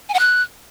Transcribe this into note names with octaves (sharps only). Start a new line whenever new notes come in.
G#5
F#5
F#6